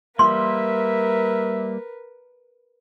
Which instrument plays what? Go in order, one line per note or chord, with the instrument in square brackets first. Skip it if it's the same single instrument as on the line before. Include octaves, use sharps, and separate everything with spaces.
[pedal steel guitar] G3 A#3 [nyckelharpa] A#4 B4 [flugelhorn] E5 [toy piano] C6